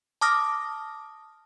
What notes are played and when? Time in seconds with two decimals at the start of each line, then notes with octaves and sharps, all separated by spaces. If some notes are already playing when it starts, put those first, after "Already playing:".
0.21 A5 D6 D#6 F6 A#6